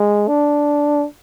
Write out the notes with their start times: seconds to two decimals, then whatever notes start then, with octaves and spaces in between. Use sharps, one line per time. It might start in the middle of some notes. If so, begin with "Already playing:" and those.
Already playing: G#3
0.28 D4